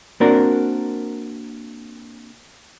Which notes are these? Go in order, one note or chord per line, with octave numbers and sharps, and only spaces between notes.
A#3 C4 D4 F#4 A#4